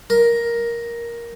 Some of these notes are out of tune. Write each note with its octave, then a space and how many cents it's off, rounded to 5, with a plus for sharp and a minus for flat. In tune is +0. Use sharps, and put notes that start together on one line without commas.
A#4 +10